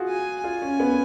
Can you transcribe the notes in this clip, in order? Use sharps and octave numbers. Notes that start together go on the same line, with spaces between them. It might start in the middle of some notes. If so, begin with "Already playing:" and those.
Already playing: F4 F#4 G#4
G#5
F4 G#5
C#4
B3